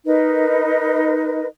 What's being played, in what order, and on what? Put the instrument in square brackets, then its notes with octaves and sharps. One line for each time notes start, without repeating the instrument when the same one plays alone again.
[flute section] D#4 A#4 B4 D#5